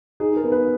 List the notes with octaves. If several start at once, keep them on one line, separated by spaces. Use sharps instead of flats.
D#4 G#4
A#4
B3
B4